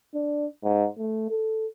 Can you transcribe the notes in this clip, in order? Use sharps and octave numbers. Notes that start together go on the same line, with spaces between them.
D4
G#2
A3
A4